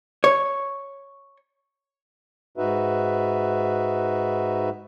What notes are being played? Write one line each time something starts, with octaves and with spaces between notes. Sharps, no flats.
C#5
G#2 D#4 F#4 B4 E5